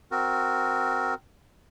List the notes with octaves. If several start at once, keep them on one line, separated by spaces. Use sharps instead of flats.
C4 F#4 A#4